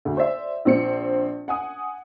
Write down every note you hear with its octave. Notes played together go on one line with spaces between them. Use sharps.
D2
C5 D5 E5
A#1 C4 C#7
F#5 G#5 D#6